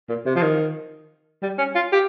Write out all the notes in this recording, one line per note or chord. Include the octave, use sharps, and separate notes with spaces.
A#2
C3
F3
D#3
G3
C#4
F4
G4